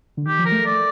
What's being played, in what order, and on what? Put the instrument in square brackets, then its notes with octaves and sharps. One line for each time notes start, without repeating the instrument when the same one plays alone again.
[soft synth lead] D3
[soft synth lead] D#3 [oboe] G4
[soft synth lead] F3
[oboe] A#4
[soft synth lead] A3
[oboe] D5